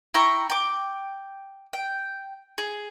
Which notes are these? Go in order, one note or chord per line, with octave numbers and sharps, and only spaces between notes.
E4 G5 A#5 C#6
G5 D6
G5
G#4